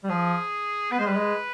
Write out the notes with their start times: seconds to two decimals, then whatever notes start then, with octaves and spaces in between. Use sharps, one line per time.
0.04 G3
0.09 F3 G#4
0.91 B3 B4
0.99 G#3 C5
1.06 G3 B4
1.16 G#3